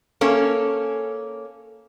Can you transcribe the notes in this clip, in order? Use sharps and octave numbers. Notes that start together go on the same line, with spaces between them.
A#3 C#4 A4